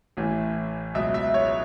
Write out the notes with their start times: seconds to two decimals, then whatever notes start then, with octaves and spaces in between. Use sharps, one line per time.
0.17 A1 A2 E3
0.95 C#2 B2 F#3 E5
1.14 E5
1.34 C#5